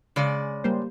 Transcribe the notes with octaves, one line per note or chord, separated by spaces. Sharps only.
C#3 G#3 D5
G3 A#3 C5